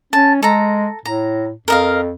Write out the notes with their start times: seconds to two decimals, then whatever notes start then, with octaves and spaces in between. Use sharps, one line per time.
0.13 C#4 A5
0.43 G#3 A4 A#5
1.05 A2 A#5
1.68 F2 A#4 D#5 F5